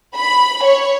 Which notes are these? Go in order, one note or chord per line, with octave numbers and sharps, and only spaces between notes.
B5
C#5